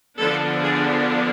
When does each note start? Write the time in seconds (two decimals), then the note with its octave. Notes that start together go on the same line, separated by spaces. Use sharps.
0.19 D3 F3 B3 D4 A4
0.63 G#4